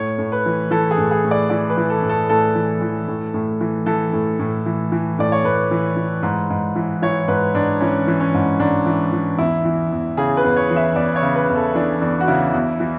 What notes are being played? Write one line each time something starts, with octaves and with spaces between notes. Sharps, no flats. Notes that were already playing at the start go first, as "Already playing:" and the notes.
Already playing: A2 C#5
A2
B4
E3
E3 A4
G#4
A2
G#4
A2
D5
E3 D5
B4
E3
A4
A2
A4
A2 A4
E3
E3
A2
A2
E3
E3 A4
A2
A2
E3
E3
A2 D5
C#5
A2 B4
E3
E3
G#2
G#2
E3
E3 C#5
G#2 B4
G#2 D4
E3 C#4
E3
C#4
G#2
G#2 D4
E3
E3
E2 E4
E3
E2
C#3 G#4
B4
E2
C#5
E3
E5
E2 D5
C#5
C#3
B4
E2
A4
E3 D4
E2 D4
F#4
C#3 E4
E2
E3